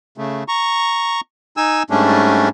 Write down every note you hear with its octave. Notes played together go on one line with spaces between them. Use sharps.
C#3 A3
A#5 C#6
D#4 G#5 E6
G#2 G3 A3 C#4 D4